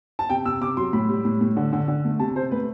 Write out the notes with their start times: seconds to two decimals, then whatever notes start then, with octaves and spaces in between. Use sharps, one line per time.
0.19 A5
0.29 C3 G5
0.45 C3 E6
0.61 C3 D6
0.77 F#3 C6
0.93 A2 B5
1.09 G3
1.25 A2
1.41 A2
1.57 D3
1.73 D3
1.88 D3
2.04 A3
2.19 C3 A5
2.35 C3 C5
2.51 A3 B4